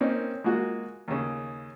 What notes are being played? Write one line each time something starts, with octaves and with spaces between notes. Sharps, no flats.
A#3 C4 C#4 D#4
G#3 A#3 F4 F#4
D#2 C#3